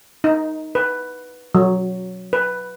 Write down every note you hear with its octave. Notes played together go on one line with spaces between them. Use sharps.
D#4
B4
F#3
B4